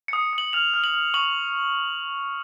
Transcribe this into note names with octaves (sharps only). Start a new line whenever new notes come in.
C#7
D#6
D#6 F#7
F6 F7
F6
F#7
F6
C#6 F#7